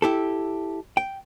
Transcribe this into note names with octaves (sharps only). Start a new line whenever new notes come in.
E4 G4 A4
G5